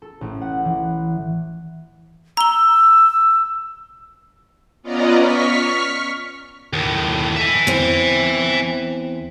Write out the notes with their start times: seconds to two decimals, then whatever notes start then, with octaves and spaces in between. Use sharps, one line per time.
0.02 A4
0.21 A1
0.41 F#5
0.65 E3
2.37 A#5 E6 G7
4.83 B3 C#4 F4 D5 D#5 A#5
5.17 C#6 F6 B6
6.73 D#2 A2
7.37 E5 G#5
7.67 E2 C4